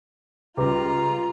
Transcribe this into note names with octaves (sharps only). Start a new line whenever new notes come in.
C#2 G3 F4 G4 B4 A#5 D6